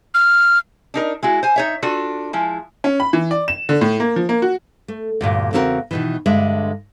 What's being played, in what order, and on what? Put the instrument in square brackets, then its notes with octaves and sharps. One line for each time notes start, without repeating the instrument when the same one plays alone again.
[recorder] F6
[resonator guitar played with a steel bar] D4 D#4 A#4
G#3 E4 F#4
C5 G#5
D#4 C#5 E5
D4 F4 F#4 A4
F3 G#3 E4
[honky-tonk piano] C#4
B5
E3
D5
E7
D3
A2
A#3
F3
A#3
F#4
[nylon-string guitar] A3
D2 G2 A#2
E2 C#3 C4 F#4 G4 A#4
B2 D#3 E3
G2 D3 G#3 E5